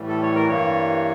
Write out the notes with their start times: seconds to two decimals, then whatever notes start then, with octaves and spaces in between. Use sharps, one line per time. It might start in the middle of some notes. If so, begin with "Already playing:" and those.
Already playing: A2 E3 G3
0.09 A4
0.22 C#5
0.36 A#4
0.48 G2 E3 G3 A#3 C#5